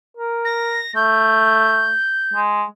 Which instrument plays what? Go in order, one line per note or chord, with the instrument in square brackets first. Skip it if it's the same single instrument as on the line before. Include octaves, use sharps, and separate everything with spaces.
[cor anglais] A#4
[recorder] A#6
[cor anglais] A3 [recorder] G6
[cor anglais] G#3